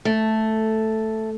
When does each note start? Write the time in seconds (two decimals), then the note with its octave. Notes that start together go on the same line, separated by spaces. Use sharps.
0.05 A3